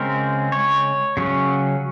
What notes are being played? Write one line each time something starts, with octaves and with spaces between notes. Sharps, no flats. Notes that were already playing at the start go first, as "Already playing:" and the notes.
Already playing: C#3 G#3 C4 A#4
C#5
C#3 F#3 C#4